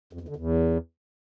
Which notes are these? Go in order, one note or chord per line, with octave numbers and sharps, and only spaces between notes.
F2
E2
D3
E2